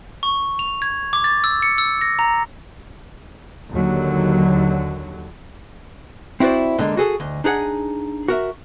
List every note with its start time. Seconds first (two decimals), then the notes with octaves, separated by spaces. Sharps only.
0.23 C#6
0.59 F7
0.82 G#6
1.13 D6
1.24 A6
1.44 E6
1.62 C#7
1.78 E6
2.01 A#6
2.19 A#5
3.70 D#2 D3 F#3
6.40 C4 E4 F#4 C5 D5
6.78 A2 D3 G#3 A#3
6.97 F#4 G#4 A4
7.20 D2 D#5
7.44 D4 D#4 G#4 F#5
8.28 F#4 A#4 E5